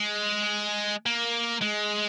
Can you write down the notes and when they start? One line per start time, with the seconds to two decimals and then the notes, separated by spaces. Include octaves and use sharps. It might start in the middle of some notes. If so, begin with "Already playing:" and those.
Already playing: G#3
1.06 A#3
1.62 G#3